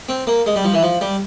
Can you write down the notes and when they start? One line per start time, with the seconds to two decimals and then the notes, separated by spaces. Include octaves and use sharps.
0.09 C4
0.27 A#3
0.46 G#3
0.56 G3
0.64 F3
0.74 E3
0.83 F3
1.01 G3